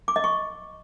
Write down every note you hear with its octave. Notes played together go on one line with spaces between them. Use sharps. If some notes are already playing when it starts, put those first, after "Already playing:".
D6
D#5
C#6